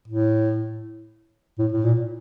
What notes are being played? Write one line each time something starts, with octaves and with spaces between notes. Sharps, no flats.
A2
A2
A2
A#2